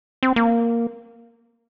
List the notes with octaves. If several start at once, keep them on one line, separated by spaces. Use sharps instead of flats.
C4
A#3